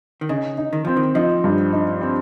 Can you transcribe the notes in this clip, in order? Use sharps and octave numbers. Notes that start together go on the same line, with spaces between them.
D#3
C#3 D#4
D#4
D#3
F3 C4
D#3
F3 D#4
G2
D#4
C4